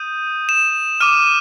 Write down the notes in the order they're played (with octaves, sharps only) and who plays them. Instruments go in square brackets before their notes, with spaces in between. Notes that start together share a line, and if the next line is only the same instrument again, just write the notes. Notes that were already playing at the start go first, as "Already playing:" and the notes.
Already playing: [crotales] D#6 G6 D#7
E7
D6 F6 D#7